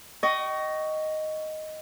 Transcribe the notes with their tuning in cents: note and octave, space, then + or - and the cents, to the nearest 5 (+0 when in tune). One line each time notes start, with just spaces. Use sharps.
D#5 +0 G5 -35 C#6 +15